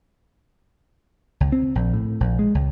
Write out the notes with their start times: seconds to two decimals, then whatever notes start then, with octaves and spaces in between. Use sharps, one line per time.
1.40 C#2
1.52 C4
1.75 A#1
1.93 A2
2.20 A#1
2.39 G#3
2.55 C#2